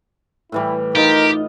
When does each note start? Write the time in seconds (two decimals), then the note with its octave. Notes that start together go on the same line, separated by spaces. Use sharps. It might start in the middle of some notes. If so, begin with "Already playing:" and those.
0.52 A2 E3 G3 E4
0.96 D#4 F4 G4 A#4 D#5